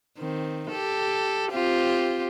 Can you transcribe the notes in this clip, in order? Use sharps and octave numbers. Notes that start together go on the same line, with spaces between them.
D#3 C4
G4 A4
C4 F4 G4